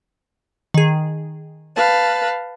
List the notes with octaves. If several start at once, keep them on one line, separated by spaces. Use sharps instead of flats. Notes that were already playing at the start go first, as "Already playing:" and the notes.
D#3 G#4
B4 F5 A5